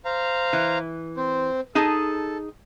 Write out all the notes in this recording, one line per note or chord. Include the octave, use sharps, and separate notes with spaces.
C5 F5 A#5
E3
C4 C5
D#4 G#4 A4 A5